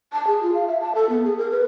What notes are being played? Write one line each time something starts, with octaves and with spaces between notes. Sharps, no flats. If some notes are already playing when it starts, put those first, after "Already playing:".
A5
G#4
F4
F5
E5
A5
A4
B3
G#4
A#4
B4